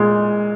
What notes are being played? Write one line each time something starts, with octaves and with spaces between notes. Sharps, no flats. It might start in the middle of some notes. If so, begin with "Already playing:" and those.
Already playing: A#2 G#3